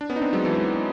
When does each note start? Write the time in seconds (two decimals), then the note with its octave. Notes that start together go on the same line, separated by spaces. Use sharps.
0.01 D4
0.10 B3 C#4
0.16 D#4
0.22 C4 D4
0.33 F#3 G#3
0.45 E3